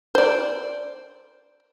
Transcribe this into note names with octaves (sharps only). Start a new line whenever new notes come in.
C5 D5